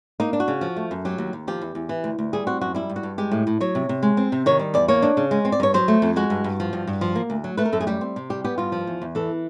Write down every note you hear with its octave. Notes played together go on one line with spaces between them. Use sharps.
A#3 D#4
D4
F#4
C#3
F3
A3
F#2
F#3 G4
D#2
D#2
F3 G4
E2
E2
E3
D2
D2
G3 G#4
C4 F#4
F#2 F#4
G3 E4
G2
F#4
G2
G#3 G4
A2
A2
F#3 C#5
C3
C3
G#3
C4
C3
D#3 C#5
G3
E2 D5
A#3 C#5
D4
C#3
G#3
C4
D5
G2 C#5
F#3 C5
A3
F2
G#3 F#4
G2
G2
F3
G2
G2
F3
A#3
D2
F#3
A3 B4
A#4
F#2 A4
G#4
G3 G4
C4
C3
G3 G4
B3 G4
G2 F4
F3
E2
E2
E3 A4